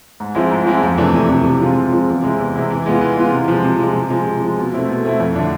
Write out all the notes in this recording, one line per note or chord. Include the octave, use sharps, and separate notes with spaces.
G#2
F3 G#3 C4 E4
G#2
F3 G#3 C4 E4
F2
C3 E3 A3 D4
F2
C3 E3 A3 D4
C3
F3 G#3 C4 F4
C3
F3 G#3 C4 F4
E2
C3 G#3 C4 E4
E2
C3 G#3 C4 E4
E3
G#3 B3 F4
E3
G#3 B3 F4
C3
F3 G#3
C3
F3 G#3
C3
F3 G#3
C3
F3 G#3
B2
A3 C4 E4
B2
A3 C4 E4
F2
D3 A3 D4